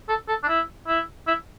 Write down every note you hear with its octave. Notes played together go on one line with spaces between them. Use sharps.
A4
A4
D4
E4
E4
E4